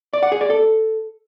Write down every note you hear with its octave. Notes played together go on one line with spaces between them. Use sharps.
D5
F#5
G#4
D5
A4